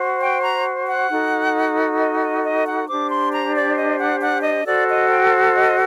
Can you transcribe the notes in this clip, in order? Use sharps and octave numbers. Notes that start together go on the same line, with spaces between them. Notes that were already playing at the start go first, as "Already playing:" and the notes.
Already playing: F#4 C5
G5
A#5
F#5
D#4 F#4 A4
D#5
D#5
D#5
F#5
D4 G4 C5 D6
C6
A#5
D5
D#5
F#5
F#5
D#5
F#4 A4 C5 D5
D#5
G5
D#5